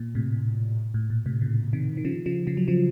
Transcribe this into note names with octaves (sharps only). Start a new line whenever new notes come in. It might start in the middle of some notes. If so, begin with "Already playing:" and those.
Already playing: A#2
A2 C3
A2
A#2
A2 C3
A#2 C#3
C3 D#3
D#3
C#3 F3
C#3 F3
C#3 F3
F#3
C#3 F3